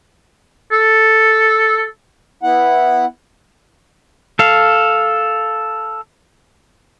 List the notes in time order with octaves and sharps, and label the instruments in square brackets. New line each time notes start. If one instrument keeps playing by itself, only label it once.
[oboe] A4
[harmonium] B3 E4 F#5
[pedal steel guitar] A4 F5